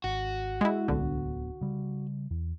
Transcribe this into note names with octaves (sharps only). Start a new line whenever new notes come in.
G#1 F#4
G#3 E4
D1 C2 D3 B3
C#3 G3
E2